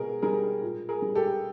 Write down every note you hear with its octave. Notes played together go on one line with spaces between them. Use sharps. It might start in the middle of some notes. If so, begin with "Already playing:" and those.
Already playing: B2 G#4 A#4
G3 G#4 A#4
A#2
G#4 A#4
G3
G4 A4